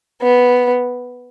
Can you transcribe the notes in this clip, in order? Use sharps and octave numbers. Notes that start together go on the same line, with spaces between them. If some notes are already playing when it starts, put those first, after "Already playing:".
B3